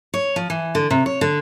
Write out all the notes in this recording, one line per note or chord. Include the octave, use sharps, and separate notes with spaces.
C#5
F3
E3
D3
C3
C#5
D3